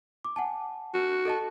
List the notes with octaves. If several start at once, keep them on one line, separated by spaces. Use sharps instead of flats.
D6
F#5 G#5 A5
F#4
A4 D#5 A5